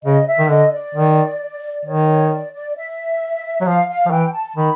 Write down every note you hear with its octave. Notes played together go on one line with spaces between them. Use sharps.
C#3 D#5
E5
D#3
D3 D#5
D5
D#3
D#3 C#5
C#5
D5
D5
E5
F#3
F3 F5
F5
F3
E3 G5
A5
D#3 B5